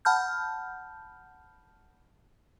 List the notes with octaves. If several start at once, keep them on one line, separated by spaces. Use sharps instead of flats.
F#5 A5 B5 F6 G6